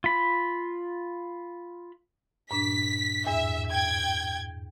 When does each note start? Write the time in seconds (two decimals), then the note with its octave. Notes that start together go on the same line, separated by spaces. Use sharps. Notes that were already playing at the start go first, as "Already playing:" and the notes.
0.04 F4 B5
2.51 G2 A#2 D4 B6
3.27 E2 G#2 E5
3.70 G5 G#6